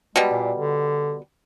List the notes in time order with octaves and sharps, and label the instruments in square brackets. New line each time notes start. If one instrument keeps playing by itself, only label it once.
[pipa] B2 G3 [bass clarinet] G#3
[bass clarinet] A#2
D3